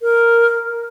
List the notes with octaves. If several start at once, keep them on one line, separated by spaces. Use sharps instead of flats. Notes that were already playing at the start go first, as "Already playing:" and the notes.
A#4